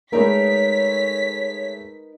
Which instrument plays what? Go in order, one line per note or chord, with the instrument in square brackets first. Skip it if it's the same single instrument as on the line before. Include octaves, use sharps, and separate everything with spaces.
[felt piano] G#3 A3 [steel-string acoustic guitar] D#4 A#4 B4 [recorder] C#5 [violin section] B6